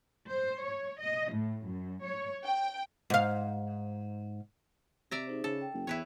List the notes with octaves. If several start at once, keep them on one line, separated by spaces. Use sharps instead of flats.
C5
C#5
D#5
A2
F#2
C#5
G5
G#2 F5
C3 D5 E5 A#5
D#4 G#4 C5
C#3 A4
G5
F#1
E2 E4 B4 C#5